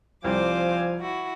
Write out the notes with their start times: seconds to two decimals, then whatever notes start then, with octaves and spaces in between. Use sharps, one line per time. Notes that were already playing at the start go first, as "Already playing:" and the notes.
0.24 C2 F3 C4 C5 D5 F5 G#5 D6
1.00 E4 F#4